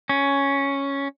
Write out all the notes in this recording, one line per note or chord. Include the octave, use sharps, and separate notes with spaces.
C#4